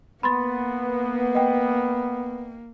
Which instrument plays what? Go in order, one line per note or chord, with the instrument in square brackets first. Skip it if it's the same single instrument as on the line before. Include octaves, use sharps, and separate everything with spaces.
[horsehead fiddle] A#3 [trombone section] B3 [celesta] B5 C6 A6
[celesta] D#5 G5